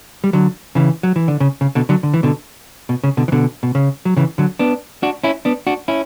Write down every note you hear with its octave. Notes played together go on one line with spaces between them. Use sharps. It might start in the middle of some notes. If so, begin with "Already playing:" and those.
G3
D3 F#3
C#3 E3
F#3
E3
D3
C#3
C#3
B2 D3
D3 F#3
D3
E3
B2 D3
B2
C#3
B2 D3
E3
B2 D3
B2
C#3
F#3
C#3 E3
D3 F#3
B3 D4
D4 F#4
C#4 E4
B3 D4
D4 F#4
C#4 E4